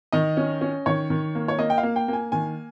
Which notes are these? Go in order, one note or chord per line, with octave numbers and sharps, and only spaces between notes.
D#3 D#5
C#4
C#4
D#3 C#5
D#3
A#3
C#5
A#3 D#5
G5
F5
A#3
G5
A#3 G#5
D#3 G#5